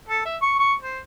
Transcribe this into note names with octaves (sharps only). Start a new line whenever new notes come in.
A4
E5
C#6
C#6
C5